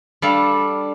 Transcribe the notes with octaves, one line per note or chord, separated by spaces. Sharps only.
G3 D4 A4 F5